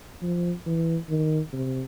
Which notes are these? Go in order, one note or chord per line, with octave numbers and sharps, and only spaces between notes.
F3
E3
D#3
C3